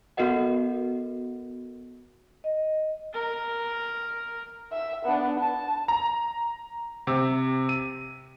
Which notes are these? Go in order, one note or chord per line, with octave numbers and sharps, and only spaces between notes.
B3 F#4 A4 A#4 D#5 F#5
D#5
A#4
E5
B3 D4
A5
A#5
C3
D#7